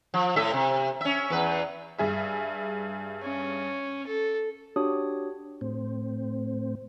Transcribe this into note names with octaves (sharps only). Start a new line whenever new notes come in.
F3
A2 A4 E5
C3
C#4 E5
E2 B4
G2 G#4 E5
C#4
A4
D4 F#4 G4 C#5 D#6
A2 C4